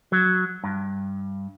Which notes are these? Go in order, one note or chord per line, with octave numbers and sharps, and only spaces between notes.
F#3
G2